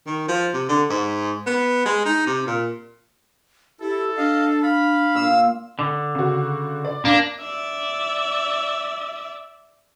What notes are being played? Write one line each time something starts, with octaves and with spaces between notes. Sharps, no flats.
D#3
F3
C3
D3
G#2
B3
G#3
D#4
C3
A#2
E4 G4 A4
D4 D#5 F5
F5 B5
A#2 E6
D3
C#3 F#4
D5
A#3 D4
D5 E5